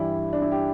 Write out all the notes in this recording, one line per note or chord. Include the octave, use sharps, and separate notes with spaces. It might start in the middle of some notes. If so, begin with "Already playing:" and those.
Already playing: G2 E3 G3 E4
D4
E4
G4